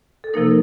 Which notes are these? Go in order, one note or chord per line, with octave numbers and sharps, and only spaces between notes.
A4
C3 F3 A#3 D#4 A#4